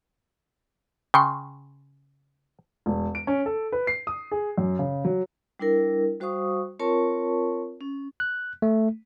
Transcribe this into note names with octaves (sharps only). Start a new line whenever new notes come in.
C#3 G5 C6 C#6
E1
D7
C#4
A4
B4
C7
D#6
G#4
F#2
C#3
F#3
G3 D4 E4 A#4
G3 F#4 C5 F5 C#6 D#6
C4 F4 A#4 C#5 A5 C#6
C#4
F#6
A3